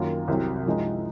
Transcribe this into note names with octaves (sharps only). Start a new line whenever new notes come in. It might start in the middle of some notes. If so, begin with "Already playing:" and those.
Already playing: F#2 D#3 A#3 F4
C2 C3 F#3
F#2 F3 G#3 D#4